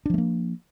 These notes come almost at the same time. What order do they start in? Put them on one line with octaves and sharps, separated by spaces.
D4 F3 A3 A#3